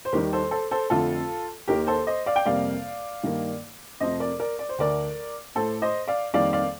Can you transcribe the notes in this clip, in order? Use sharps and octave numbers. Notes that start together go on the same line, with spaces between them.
C5
D#2 D#3 G3 G4 A#4
A4 C5
A4 C5
A4 C5
F2 D3 A3 F4 A4
D#2 D#3 A#3 G4 A#4
A4 C5
C5 D#5
D5 F5
G5
F2 C3 G3 A#3 D5 F5
G2 D#3 A#3
F2 C3 F3 A3 C5 D#5
A#4 D5
A#4 D5
D5
C5
D2 D3 A3 A#4 D5
A2 A3 A4 C5
C5 D#5
D5 F5
F2 D#3 G3 A#3 D5 F5
D5 F5